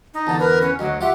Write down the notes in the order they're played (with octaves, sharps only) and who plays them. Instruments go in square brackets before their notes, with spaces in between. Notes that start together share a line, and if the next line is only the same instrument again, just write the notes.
[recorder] D#4
[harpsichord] E2 D3 [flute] A5
[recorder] A#4 [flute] B4
[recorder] C#4
[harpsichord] D2 [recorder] F#3 [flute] D#5
[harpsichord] F4 F#5 [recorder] G4 [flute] E5